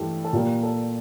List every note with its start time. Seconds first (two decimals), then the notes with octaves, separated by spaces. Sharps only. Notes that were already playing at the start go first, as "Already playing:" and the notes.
Already playing: G2 E3 A3 G4 A4
0.25 A4
0.33 A#2 G3 A#3 G4
0.63 A4